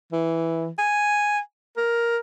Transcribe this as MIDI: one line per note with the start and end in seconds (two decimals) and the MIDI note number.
0.13 0.68 52
0.78 1.39 80
1.77 2.18 70